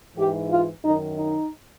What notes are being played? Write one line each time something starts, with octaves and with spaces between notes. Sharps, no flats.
G#2 E3 G4
F4
F#2 D#3 D#4
D#4